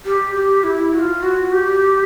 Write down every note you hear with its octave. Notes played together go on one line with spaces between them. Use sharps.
G4
G4
E4
F#4
F4
F#4
G4